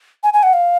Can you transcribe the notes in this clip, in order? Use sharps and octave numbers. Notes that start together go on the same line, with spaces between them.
G#5
G#5
F#5
F5